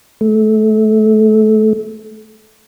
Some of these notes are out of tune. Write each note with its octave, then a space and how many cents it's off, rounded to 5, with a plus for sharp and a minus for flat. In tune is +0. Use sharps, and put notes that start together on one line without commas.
A3 -25